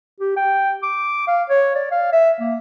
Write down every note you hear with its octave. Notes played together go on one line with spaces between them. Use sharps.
G4
G5
D6
F5
C#5
D5
F5
E5
A#3